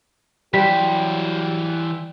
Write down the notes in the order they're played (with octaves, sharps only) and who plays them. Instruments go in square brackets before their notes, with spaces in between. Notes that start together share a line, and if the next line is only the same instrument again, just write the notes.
[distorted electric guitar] E3 C5 [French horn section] F#3 G4 [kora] G3 [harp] B6